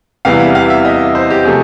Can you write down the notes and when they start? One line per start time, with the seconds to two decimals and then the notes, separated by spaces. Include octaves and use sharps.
0.25 E2 C3 E3 G3 B3 F5
0.40 E5
0.55 F5
0.70 E5
0.85 D#5
1.15 C5
1.30 G4
1.45 C3 F3 A3 G#4